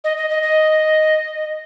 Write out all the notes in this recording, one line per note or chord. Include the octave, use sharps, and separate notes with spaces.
D#5
D#5
D#5
D#5